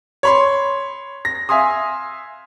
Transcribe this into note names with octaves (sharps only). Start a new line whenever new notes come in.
C#5 B5 C6
A#6
E5 F5 G#5 C6 D#6